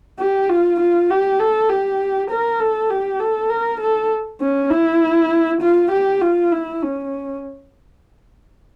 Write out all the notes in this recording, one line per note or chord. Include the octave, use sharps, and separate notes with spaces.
G4
F4
F4
G4
A4
G4
A#4
A4
G4
A4
A#4
A4
C#4
E4
F4
G4
F4
E4
C#4